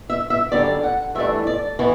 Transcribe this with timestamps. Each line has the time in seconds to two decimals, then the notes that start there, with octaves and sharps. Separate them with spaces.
0.10 E5
0.30 E5
0.52 F#2 D3 G3 D5
0.83 F#5
1.15 G2 E3 A3 D4 E5
1.47 D5
1.79 E3 B3 F#4